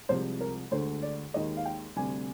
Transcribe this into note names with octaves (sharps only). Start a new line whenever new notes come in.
C2 C3 F3 G#3 C5
A#4
D2 D3 G#3 C5
D5
D#2 D#3 G#3 D#5
F5
G5
D2 C3 G3 G#5